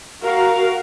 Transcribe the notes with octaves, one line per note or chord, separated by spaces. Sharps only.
F#4 A#4 F5